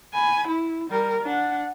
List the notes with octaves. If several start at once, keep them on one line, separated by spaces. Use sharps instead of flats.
G#5 B5
E4
G3 A#4
D4 F#5